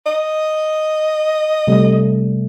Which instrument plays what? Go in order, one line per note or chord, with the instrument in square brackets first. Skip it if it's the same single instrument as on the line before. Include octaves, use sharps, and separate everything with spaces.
[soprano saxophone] D#5
[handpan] C3 G3 A3